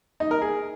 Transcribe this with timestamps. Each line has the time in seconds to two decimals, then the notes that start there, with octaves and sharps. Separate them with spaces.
0.20 D#4
0.31 A#4
0.42 G#4